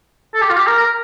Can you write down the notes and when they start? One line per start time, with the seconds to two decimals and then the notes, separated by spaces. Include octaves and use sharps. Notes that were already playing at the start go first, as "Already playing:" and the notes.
0.34 A4
0.42 G4
0.50 F4
0.57 G4
0.67 A#4
0.78 A#4